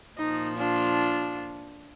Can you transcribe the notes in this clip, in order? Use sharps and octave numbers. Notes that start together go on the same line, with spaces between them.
A#2 F3 D#4
D4 F4